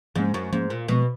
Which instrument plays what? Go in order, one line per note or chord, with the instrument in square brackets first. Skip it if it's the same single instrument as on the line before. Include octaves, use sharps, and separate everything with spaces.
[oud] G#2 [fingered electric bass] F3 A#3 C#4
[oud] F#2
[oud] G#2 [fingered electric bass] F3 A#3 C#4
[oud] A#2
[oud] B2 [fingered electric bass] F3 G#3 B3